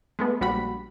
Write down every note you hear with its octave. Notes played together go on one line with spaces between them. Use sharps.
G#3 A3 B3
A#1 G3 F#4 B5